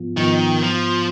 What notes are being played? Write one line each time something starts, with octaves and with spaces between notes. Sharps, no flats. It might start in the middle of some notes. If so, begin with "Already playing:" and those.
Already playing: G#2 F3 B3 F4
G#2 D#3 F3 B3 F4
F3